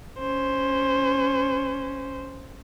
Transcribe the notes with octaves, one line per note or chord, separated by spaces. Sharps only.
C#4 C5